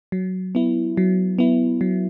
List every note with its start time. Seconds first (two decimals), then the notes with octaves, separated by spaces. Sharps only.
0.12 F#3
0.55 B3 E4
0.97 F#3
1.39 B3 E4
1.81 F#3